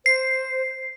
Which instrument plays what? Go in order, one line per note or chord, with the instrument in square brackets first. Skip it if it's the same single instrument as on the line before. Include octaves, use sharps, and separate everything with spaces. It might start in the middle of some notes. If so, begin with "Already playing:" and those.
[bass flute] C5 [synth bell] C7